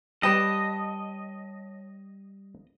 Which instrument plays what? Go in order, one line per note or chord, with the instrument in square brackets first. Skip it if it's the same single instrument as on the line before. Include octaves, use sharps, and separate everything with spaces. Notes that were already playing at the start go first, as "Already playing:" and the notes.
[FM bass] G3 [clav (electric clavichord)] G4 B4 G5 [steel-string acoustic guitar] C#5 A5 [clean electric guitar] D#5